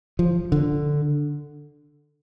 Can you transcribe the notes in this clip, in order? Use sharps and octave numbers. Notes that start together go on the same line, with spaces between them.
F3
D3